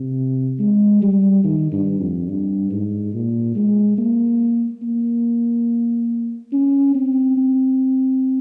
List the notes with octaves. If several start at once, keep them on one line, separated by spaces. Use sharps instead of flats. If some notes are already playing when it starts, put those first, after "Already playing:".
Already playing: C3
G#3
G3
D#3
G2
F2
G2
G#2
A#2
G#3
A#3
A#3
C#4
C4
C4